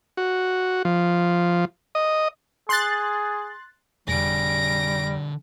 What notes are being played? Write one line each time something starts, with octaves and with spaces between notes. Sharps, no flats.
F#4
F3
D#5
G#4 C6 F#6 A6
F1 D3 G3 G#4 A#6 D7